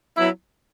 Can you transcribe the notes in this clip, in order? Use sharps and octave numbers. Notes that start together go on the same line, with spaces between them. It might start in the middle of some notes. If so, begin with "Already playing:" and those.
F#3 B3 E4